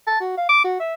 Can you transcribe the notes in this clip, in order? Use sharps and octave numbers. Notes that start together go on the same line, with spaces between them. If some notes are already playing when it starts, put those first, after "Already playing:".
A5
F#4
F5
D6
F#4
E5